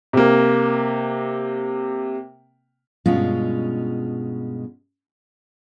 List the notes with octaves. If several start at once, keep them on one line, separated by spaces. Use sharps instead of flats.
C3 A#3
G2 B2 G#3 C#4 F4